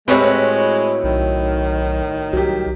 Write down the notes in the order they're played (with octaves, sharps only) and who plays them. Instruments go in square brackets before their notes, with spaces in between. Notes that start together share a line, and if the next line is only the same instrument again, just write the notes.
[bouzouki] A2 F#4 B4 [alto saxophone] G#3 [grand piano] C4 G4 C#5
[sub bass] B1 [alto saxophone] D#3
[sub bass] C2 [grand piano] F#3 G4